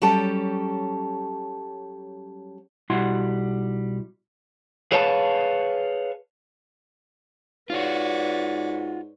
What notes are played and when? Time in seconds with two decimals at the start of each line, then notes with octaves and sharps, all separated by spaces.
0.02 F#3 G3 C#4 G4 A4 A5
2.90 B1 G3 E4 F#4 F#5 C6
4.92 G#4 B4 C#5 F5 A5
7.70 G#2 F4 F#4 B4 C#5 D5